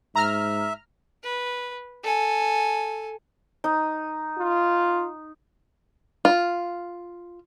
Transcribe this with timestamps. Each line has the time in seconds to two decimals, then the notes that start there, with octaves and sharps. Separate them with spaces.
0.16 G#2 E5 A#5 F6
1.23 B4
2.04 A4 G#5
3.64 D#4
4.39 F4
6.25 F4